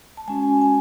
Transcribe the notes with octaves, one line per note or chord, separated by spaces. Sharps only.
A5
G#3 C#4 F#4 G#5
G#5